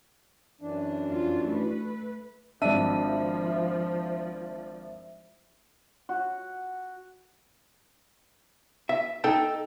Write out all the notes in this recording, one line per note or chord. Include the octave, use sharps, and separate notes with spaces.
F#2 E3 D4
F2 F4
A3 B4
G#1 F3 D4 E5 D#7
F#4
E5
D#4 A4 G5 A5